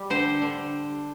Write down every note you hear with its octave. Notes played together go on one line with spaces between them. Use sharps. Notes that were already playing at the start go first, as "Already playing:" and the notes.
Already playing: G3
D3 C5
D3